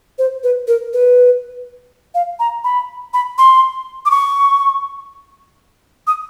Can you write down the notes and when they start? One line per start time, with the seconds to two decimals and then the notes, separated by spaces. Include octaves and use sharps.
0.19 C5
0.43 B4
0.68 A#4
0.93 B4
2.15 F5
2.40 A#5
2.64 B5
3.14 B5
3.38 C6
4.06 D6
4.11 C#6
6.07 D#6